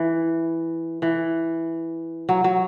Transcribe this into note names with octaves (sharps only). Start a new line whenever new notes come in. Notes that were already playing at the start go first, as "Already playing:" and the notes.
Already playing: E3
E3
F#3
F#3